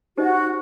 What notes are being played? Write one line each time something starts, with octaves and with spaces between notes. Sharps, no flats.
D#4 F#4 G4 C5 D#5